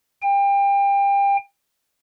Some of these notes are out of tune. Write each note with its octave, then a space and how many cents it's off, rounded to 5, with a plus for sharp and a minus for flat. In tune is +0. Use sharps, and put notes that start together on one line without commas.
G5 +30